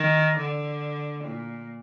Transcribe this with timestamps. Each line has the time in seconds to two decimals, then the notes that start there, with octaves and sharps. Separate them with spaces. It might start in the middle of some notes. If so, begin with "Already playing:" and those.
Already playing: D#3
0.37 D3
1.25 A#2